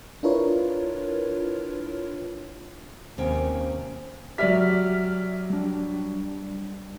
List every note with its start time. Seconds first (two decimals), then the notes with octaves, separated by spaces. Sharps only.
0.23 D4 E4 F4 A#4 B4 C#5
3.18 D#2 C3 C#4 G5
4.38 F#3 G4 D5 E5 F6 B6
5.50 G3 D4